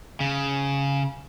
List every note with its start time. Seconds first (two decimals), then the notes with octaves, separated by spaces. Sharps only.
0.20 C#3